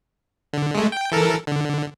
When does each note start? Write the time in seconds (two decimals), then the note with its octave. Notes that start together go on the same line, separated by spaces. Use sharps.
0.53 D3
0.75 G#3 A3
0.92 G5
1.12 E3 A4 A#4
1.47 D3